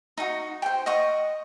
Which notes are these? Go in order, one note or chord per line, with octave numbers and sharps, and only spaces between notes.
D#4 F#4
C5 G5
D#5 F#5 C#6 D#6